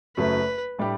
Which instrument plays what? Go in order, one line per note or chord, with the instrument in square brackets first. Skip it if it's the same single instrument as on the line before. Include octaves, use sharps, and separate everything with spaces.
[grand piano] F#1 F#2 F#3 A3 [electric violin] B4
[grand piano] A2 G3 D4 G4